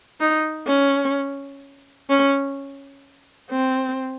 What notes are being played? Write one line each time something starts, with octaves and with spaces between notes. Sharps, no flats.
D#4
C#4
C#4
C4